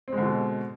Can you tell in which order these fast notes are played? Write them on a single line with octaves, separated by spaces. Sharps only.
C4 G#3 D3 B2